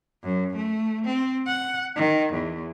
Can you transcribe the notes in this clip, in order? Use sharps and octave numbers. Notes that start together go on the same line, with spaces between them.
F#2
A3
C4
F#5
D#3
E2